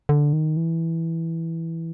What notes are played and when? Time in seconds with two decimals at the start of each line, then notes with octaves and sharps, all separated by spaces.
0.09 D3
0.33 D#3
0.57 E3